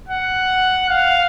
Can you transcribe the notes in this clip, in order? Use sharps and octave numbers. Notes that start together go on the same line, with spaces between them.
F#5
F5